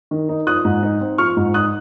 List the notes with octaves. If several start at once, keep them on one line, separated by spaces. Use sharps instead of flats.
D#3
D#4
F3 D#6 F#6
G#2
D#4
C4
F3 C#6 F6
G#2
D#4 D#6 F#6